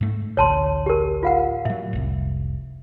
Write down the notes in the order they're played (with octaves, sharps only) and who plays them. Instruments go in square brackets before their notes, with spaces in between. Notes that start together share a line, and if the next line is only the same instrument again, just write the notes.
[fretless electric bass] G#2 A3
[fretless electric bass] A1 D2 [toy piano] C#5 A5 C6
[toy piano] G4 A#4
F4 F5 F#5
[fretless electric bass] A2 F#3 [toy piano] E5
[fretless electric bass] F1 C2